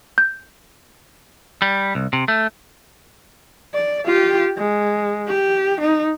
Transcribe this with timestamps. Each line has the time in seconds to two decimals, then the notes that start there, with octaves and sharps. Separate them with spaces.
0.18 G6
1.62 G3
1.95 C2
2.13 C3
2.28 A3
3.75 D5
4.06 F4 G4
4.58 G#3
5.28 G4
5.82 D#4